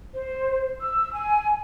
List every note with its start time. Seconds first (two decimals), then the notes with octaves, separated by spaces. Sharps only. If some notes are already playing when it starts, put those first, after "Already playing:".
0.14 C5
0.81 E6
1.13 G#5